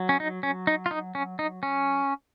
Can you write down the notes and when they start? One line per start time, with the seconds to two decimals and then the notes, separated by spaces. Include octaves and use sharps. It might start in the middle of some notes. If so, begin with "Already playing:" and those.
Already playing: F#3
0.09 C#4
0.20 D#4
0.43 C#4
0.67 D#4
0.86 F4
0.91 D#4
1.15 C#4
1.39 D#4
1.63 C#4